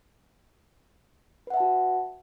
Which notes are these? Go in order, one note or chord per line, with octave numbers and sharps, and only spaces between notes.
F#4 B4 E5 F#5 A5